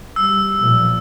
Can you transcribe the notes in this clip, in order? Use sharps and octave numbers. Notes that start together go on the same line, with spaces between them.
G3 E6
B1 A#2 F3